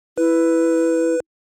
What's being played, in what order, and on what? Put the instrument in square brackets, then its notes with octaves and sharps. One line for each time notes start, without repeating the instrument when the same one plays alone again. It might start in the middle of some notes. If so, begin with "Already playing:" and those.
[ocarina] E4 [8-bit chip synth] B4